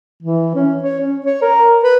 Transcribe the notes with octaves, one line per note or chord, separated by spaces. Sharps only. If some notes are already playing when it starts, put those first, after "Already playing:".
E3
C#4
C#5
C#4
C#5
A#4
B4